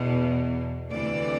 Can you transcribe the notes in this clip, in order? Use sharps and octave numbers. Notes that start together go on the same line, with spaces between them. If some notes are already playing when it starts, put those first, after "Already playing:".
Already playing: E2 B2
D2 C3 E3 D5